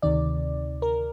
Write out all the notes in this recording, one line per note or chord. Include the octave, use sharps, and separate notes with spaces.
D2 C3 D#3 D5
A#4